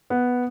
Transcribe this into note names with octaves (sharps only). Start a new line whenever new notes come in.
B3